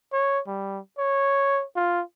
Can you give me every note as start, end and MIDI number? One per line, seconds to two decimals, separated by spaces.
0.13 0.41 73
0.47 0.80 55
0.98 1.64 73
1.76 2.02 65